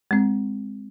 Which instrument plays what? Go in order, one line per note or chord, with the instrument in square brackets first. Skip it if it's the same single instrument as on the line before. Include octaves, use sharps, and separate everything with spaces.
[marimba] G#3 C4